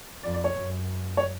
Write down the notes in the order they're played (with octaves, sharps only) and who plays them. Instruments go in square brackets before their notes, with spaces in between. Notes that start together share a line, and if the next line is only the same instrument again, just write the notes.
[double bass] F2 [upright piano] D5
[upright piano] D5
C#5
[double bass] F#2
[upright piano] C#5